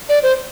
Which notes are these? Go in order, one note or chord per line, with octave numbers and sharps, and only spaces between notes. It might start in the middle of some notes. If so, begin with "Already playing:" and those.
D5
C5